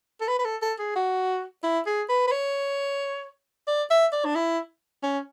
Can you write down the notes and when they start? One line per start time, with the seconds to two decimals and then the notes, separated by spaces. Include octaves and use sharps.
0.21 A4
0.28 B4
0.39 B4
0.45 A4
0.62 A4
0.79 G#4
0.96 F#4
1.64 E4
1.87 G#4
2.09 B4
2.28 B4
2.32 C#5
3.68 D5
3.90 E5
4.12 D5
4.25 D4
4.35 E4
5.03 C#4